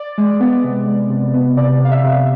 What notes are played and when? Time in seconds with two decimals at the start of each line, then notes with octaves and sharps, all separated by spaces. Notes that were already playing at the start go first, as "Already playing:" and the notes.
Already playing: D5
0.18 G#3
0.40 B3
0.64 C3
0.87 G#3
1.10 C3
1.34 B3
1.57 C3 D5
1.80 C3
1.85 F5
1.91 E5
2.04 C3